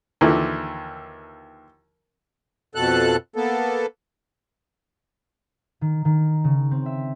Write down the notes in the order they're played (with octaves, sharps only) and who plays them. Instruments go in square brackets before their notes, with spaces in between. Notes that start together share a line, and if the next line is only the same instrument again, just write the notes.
[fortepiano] D#2 D3 E3 F3
[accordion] F2 B2 A4 F#6
A#3 B3 A4
[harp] D#3
D#3
C#3
C4
E5